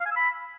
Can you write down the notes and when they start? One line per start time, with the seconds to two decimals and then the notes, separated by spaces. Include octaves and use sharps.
0.01 F5
0.06 G#5
0.11 E6
0.16 B5